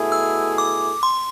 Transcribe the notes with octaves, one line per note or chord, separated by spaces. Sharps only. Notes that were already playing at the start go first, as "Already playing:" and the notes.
Already playing: B2 A3 E4 G#4
E6
D6
C6